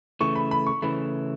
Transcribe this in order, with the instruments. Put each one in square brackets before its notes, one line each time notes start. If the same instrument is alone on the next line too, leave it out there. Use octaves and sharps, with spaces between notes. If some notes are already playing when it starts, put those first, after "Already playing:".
[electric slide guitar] C#3 E3 A3 [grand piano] C#6
[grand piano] B5
B5
C#6
[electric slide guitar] C#3 E3 A3 [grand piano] B5